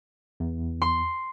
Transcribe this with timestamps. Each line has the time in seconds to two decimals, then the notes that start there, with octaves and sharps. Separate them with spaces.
0.40 E2
0.82 C6